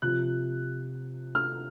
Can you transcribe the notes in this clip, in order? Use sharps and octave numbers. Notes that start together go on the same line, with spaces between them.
C3 F3 F#6
F6